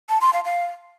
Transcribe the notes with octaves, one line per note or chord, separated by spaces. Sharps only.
A5
C6
F5
F5